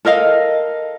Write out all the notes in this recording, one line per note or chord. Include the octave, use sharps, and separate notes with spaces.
A4 A#4 D#5 F5